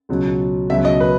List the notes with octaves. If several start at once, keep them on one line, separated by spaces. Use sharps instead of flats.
C#2 B2 F#3
C#2 B2 F#3 E5
D#5
B4